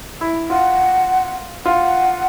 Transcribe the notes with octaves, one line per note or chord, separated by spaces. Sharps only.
E4
F4 F#5
F4 F#5